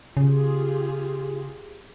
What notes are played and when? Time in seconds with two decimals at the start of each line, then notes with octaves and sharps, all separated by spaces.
0.17 C#3 F4 G4 G#4